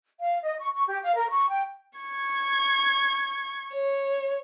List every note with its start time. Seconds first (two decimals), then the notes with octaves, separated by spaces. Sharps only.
0.20 F5
0.43 D#5
0.59 C#6
0.75 C#6
0.88 G4
1.05 F5
1.16 A#4
1.30 C#6
1.49 G5
1.99 C#6 G#6
3.73 C#5